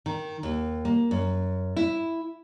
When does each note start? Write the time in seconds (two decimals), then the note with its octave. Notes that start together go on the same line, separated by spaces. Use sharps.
0.06 D#3
0.43 D#2
0.85 A#3
1.11 F#2
1.76 E4